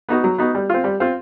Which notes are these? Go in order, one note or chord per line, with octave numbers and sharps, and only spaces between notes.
B3 D#4 F#4
F#3
B3 D#4 F#4
G3
C4 F4
G3
C4 F4